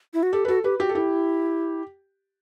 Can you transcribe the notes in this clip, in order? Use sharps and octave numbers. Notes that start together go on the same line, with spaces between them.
E4
F#4
G4 A4
B4
F#4 A4
G4 B4
F#4 G4
A4
E4 G4